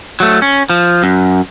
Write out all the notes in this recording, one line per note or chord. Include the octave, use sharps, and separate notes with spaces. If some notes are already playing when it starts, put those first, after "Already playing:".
F#3 A3
C#4
F3
F#2